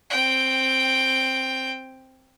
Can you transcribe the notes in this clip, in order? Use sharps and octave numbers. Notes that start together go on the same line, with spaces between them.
C4 G5